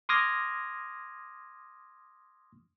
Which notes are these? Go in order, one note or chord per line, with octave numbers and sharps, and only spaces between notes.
C6 D6 D#6 F6 G#6 A#6